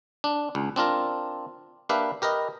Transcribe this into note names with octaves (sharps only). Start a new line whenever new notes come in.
D4
C#2
C4 D4 F4 A#4
A#3 D4 G4 B4 E5 F5
G4 A#4 B4 D#5